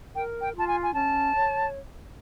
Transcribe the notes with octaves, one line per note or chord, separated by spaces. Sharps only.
A#4 G5
G5
F4 A5
G#5
G#5
C#4 A5
C#5